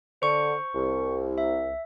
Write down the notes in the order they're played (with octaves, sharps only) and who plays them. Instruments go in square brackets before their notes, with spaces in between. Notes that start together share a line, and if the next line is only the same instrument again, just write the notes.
[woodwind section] D3 [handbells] C5 C#6 C#7
[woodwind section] C2
[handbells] E5